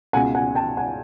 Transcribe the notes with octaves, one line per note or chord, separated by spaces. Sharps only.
C#2 B2 F#5 G#5
F#5 G#5
G5 A5
F#5 G#5